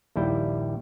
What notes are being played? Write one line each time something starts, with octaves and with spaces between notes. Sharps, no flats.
A#1 D#2 G3 E4 G5